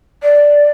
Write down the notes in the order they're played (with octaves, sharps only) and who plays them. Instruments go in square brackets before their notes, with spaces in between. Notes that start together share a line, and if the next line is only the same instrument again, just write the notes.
[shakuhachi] D5